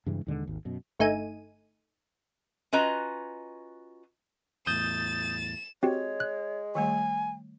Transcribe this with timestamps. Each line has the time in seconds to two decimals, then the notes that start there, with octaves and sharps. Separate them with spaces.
0.06 G2 C#3 E3 G#3
0.27 D#2 B2 D3 G#3
0.43 G#1 D#2
0.65 F#2 B2
0.99 G1 A3 D#4 G#5 D#7
2.73 C#4 F4 F#4 B4 D#5 A#5
4.67 E2 A2 D#6 G6 A6 E7
5.83 G#3 C4 F#4 G4 C#5
6.20 F#6
6.75 D#3 G3 A3 G#5